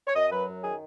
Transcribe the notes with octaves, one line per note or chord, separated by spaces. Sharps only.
C#5
F#2 D#5
F#3 B4
F#2
D#3 G#4